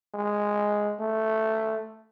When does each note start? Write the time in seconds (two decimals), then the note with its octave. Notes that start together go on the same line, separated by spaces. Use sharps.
0.15 G#3
1.00 A3